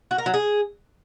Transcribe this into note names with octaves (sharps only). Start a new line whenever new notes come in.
F#4
A#4
F#3
G#4